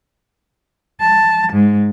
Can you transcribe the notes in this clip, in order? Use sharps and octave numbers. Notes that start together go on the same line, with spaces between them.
A5
G#2